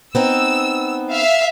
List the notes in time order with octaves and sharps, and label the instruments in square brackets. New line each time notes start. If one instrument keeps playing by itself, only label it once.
[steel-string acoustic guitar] B3 C4 D#4 [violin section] E6
[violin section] E5 F5